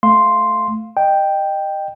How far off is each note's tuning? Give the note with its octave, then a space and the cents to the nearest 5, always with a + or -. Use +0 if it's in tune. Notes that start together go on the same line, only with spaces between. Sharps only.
A3 -5 F5 +0 C6 +0
D#5 -25 G5 +0